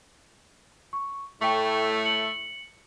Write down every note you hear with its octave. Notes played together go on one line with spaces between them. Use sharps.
C#6
A2 A3 G5 C#6
C#7 F#7